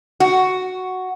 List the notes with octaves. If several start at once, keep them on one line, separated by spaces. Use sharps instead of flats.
F#4